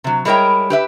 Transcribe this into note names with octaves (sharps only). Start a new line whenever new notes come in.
C3 F#3
G3 G#3 E4 A#4 C#5 G5
G4 B4 E5